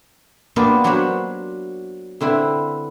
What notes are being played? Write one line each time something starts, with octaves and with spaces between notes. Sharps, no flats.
A#3 B3 D4 F4 G4 D5
F#3 D4 F#4 C5 C#5 B5
D3 C4 E4 B4